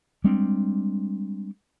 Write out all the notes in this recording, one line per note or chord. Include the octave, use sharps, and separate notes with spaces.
G3 G#3 C4 D4